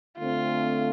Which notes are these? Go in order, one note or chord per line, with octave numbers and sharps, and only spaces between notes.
D3 A3 C4 F4